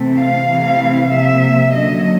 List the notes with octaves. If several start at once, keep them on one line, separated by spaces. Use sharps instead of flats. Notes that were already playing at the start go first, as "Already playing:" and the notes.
Already playing: C3 E3 A3 C4
F5
C3 E3 A3 C4
C3 F3 A#3 E5
D3 F#3 A#3 C#4 D#5